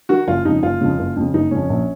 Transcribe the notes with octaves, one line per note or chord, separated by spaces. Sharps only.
D#3 F#4
F#1 F4
F2 C#3 D#4
F#1 F4
F2 C#3
F#1
F2 C#3
F#1 D#4
F2 C#3 C#4
A#1